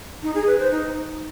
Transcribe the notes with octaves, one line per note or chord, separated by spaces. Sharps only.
D#4
G#4
B4
C5
D#4